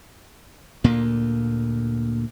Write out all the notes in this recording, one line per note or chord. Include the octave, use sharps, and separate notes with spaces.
D2 A#2 A#3